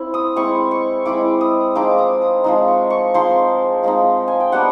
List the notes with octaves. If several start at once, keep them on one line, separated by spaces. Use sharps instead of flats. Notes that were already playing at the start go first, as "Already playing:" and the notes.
Already playing: C4 E4
D#6
G#3 C4 E4 C#6
C#6
G#3 C4 E4 D6
D#6
F3 G#3 C4 D#4 D6
D6
D#6
D#6
F3 G#3 C4 D#4
C#6
C#6
F3 G#3 C4 D#4 C6
F3 G#3 C4 D#4
G#5
G5
G3 B3 D4 F#5